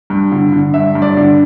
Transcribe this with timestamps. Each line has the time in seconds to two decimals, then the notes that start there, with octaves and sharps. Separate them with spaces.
0.10 G2
0.32 D3
0.52 D3
0.74 G2 E5
0.95 G2
1.02 D5
1.17 D3